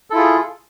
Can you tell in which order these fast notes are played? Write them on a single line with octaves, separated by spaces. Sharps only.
A4 E4 F4 G#4